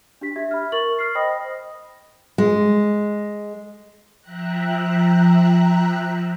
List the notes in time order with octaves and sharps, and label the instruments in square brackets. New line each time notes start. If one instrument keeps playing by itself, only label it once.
[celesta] D4 G4 B6
G4 E5 G#6
B5 F6
A#4 C#6 A6 F#7
F6 C7
C5 D#5 G5 B5 D#6 A#6
[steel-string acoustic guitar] G#3
[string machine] F3 E5 G5 A#5 F#6